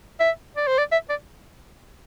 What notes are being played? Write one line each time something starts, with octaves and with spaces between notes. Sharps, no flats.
E5
D5
C5
D5
E5
D5